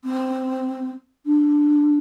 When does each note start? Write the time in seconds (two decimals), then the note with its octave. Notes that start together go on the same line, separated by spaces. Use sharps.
0.04 C4
1.26 D4